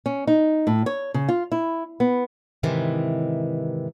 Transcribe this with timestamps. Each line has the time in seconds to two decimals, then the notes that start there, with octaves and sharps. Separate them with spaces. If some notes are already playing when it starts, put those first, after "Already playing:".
0.06 C#4
0.27 D#4
0.67 A2
0.86 C#5
1.14 C#3
1.29 F4
1.52 E4
2.00 B3
2.63 G#2 C3 D#3 E3